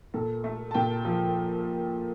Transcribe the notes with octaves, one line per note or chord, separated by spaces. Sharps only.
A#2 A4
A3 A4
A5
A#2 G5
F3